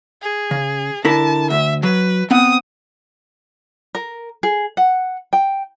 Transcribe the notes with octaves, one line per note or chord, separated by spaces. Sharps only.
G#4
C#3
D3 E4 A#4 A5
D2 E5
F#3 B4
B3 C4 F#5 D#6
A#4
G#4
F#5
G5